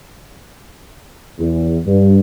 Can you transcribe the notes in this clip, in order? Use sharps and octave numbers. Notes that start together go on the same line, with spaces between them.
E2
G2